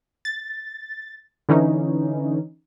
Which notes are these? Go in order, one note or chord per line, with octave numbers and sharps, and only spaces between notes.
A6
D3 E3 C#4 D#4